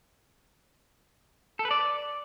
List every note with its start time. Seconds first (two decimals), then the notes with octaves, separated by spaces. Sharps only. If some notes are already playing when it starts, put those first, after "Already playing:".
1.59 A4
1.65 B4
1.71 D5